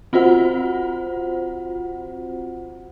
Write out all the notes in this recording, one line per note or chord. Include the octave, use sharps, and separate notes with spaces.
C4 F4 F#4 C5 F#5